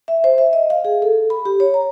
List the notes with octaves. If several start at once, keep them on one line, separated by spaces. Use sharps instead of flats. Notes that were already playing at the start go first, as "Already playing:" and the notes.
E5
C5
E5
D#5
F5
G#4
A4
B5
G4
C#5
A#5